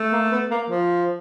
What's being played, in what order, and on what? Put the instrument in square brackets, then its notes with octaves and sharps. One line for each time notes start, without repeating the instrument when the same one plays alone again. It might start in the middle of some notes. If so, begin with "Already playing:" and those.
Already playing: [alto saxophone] A3
[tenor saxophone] A#3
B3
A#3
F3